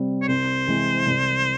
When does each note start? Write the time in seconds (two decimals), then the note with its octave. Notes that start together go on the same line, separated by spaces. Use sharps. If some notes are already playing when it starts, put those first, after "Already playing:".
Already playing: C3 G3 C4
0.22 C#5
0.28 C2 C5
0.67 C3 E3 G#3 C4
1.06 C2